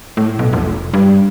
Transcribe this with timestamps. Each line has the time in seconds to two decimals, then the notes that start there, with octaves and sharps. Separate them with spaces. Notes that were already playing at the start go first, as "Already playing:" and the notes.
0.17 A2
0.39 B1
0.53 F1
0.94 G2